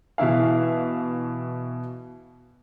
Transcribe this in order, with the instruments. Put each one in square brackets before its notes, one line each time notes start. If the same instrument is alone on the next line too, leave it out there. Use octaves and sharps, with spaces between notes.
[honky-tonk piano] B2 E3 E4 F5